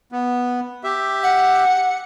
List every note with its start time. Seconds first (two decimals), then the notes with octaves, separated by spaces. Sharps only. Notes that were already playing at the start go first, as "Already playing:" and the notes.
0.12 B3
0.84 G4 E5
1.23 F#5